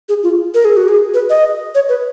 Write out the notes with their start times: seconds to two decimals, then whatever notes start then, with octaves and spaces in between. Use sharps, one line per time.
0.09 G#4
0.23 F4
0.54 A#4
0.65 G#4
0.77 F#4
0.88 G#4
1.14 B4
1.30 D#5
1.75 C#5
1.89 B4